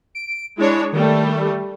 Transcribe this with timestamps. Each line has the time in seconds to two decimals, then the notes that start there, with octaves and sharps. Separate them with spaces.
0.15 D7
0.58 G#3 D4 E4 C#5
0.92 D#3 G3 A3